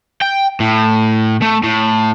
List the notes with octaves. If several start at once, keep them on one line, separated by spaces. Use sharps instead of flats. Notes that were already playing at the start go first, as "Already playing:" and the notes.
G5
A2
A3
A2